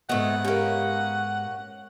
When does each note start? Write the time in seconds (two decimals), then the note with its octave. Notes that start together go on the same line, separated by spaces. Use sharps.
0.09 G#2 G#3 A3 B3 F#5
0.45 A#3 C#4 G4